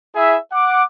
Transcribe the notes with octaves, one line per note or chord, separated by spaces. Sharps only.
E4 G#4 E5
F#5 D6